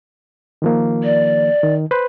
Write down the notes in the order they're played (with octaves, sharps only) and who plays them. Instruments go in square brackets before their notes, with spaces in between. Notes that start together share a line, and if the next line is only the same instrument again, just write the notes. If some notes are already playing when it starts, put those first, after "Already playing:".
[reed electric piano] D#3 F3 A#3
[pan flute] D5
[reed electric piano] D#3
B4 C5